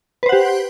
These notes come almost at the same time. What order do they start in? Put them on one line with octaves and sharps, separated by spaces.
B4 C5 F#5 G4